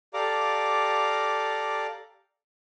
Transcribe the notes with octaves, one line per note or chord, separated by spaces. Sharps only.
G4 A4 D5 F5 A#5 D6